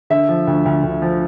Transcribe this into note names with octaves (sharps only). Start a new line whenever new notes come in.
D3 E5
F3
D2
D2
D2
F3